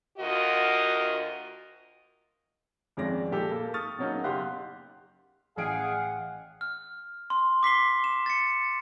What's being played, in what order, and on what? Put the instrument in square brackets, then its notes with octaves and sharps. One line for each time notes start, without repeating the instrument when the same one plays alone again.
[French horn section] D2 F4 F#4 A#4 D#5
[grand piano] G#1 F2 G#3 C#4 D5 A#6
A#2 G#3 G4 A4
A#3 A4
C#6 D#6 F6 A6
B2 F#3 A#3 C#4 D#4 G#4
F#1 G4 F5 F#5 C6 F#6
[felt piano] A1 G#5 D7 [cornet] G#4 [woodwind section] F5 [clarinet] F#5
[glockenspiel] F6
C6
D6 B6 C7 G7
E7
A6 C#7